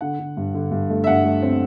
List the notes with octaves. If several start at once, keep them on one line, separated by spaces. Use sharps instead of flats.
D3 F#5
D3
G2
D3
G2
A3
E5
G2 F#5
A3
C4